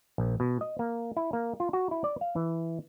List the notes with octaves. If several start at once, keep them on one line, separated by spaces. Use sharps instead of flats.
A#1
B2
D#5
A#3
E4
A#3
F4
F#4
E4
D5
F5
E3